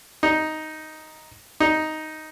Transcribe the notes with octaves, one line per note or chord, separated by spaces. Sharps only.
D#4
D#4